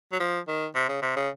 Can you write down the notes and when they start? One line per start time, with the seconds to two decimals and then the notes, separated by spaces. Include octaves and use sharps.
0.12 F#3
0.20 F3
0.48 D#3
0.75 C3
0.89 C#3
1.02 C3
1.16 C#3